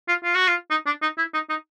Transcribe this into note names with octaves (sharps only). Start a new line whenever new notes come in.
F4
F4
F#4
F4
D#4
D4
D#4
E4
D#4
D#4